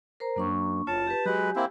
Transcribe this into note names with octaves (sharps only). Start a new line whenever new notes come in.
A#4 C5 A#5
F#2 A#3 D4 C#6
F#1 F4 C#5 A5
G4 B4
F#3 G#3 G4 B4 G#5
A#3 C4 E4